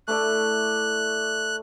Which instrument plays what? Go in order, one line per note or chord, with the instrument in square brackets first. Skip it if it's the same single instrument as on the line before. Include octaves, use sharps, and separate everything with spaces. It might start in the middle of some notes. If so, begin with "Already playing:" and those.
[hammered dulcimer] A3 E4 D5 [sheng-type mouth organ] F#6